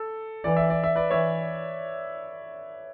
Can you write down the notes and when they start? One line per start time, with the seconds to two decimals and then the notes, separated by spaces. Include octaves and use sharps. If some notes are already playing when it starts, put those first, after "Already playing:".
Already playing: A4
0.44 E3 D5
0.57 E5
0.70 D5
0.84 E5
0.95 B4 D5
1.11 E3 C#5 E5